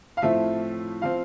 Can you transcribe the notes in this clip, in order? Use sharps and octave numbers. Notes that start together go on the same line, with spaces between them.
F5
A2 F3 A3 C4 E5
F3 C4 F5